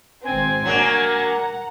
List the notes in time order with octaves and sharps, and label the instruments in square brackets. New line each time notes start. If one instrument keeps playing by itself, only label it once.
[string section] G#1 C4 [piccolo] G#5
[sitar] F#3 A#3 D4 [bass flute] A#4 [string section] F#5 A#5